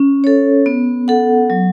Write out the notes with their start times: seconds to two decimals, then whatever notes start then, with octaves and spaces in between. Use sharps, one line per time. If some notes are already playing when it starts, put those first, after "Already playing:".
Already playing: C#4
0.24 A4 C#5
0.66 B3
1.08 A4 F#5
1.50 F#3